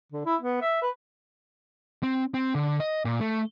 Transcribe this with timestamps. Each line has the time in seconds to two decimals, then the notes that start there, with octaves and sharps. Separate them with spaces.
0.12 D3
0.25 E4
0.41 B3
0.61 E5
0.82 B4
2.03 C4
2.34 C4
2.55 D3
2.80 D#5
3.05 A#2
3.21 A3